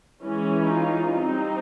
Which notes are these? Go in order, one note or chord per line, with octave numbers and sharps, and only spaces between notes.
E3 G#3 C#4
D#4 F4
G3 C4 D#4